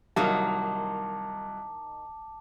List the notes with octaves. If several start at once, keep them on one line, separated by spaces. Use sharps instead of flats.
C2 D#3 F#3 A#3 D#4 A5 D6